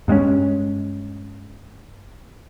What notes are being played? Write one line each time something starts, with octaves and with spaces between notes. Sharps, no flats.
G2 G#3 C4 C#4